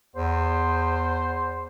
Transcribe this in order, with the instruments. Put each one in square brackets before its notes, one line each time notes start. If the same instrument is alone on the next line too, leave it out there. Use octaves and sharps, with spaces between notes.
[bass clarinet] E2 [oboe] C5